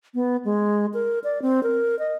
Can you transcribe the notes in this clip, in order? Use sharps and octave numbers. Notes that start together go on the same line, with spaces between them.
B3
G#3
A#4
D5
C4
A#4
D#5